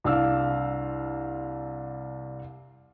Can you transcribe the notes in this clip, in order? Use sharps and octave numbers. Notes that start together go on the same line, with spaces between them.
C2 D4 F5 E6